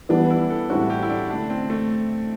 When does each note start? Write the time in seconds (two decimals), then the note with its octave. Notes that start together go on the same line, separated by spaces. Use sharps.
0.09 E3 G3 B3 D4
0.30 E4
0.50 A4
0.70 A2 G3 C4 E4 F#4
0.90 G4
1.03 E4
1.10 D4
1.30 D3 A3 D4 E4
1.50 C4
1.70 A3